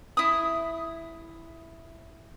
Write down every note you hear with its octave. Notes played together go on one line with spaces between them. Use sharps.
E4 D#6